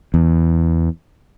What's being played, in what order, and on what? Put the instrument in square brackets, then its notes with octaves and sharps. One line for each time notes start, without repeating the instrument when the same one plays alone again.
[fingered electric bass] E2